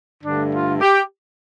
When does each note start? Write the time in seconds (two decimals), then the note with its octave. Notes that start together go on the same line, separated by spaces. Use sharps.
0.24 G2 D3 A3 D4
0.53 F4
0.81 G4